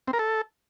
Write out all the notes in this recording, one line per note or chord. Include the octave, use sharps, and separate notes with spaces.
C4
A#4
A4